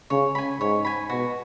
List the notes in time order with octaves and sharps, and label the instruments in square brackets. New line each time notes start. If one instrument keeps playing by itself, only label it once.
[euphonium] C#3 [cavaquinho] C#5
[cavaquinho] G#5 B5
[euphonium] G#2 [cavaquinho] C#5
[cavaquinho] G#5 B5
[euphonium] B2 [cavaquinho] F#4